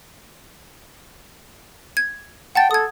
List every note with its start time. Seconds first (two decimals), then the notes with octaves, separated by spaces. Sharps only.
1.97 G#6
2.55 F#5 G5 A5 A6
2.71 A4 D#6 G#6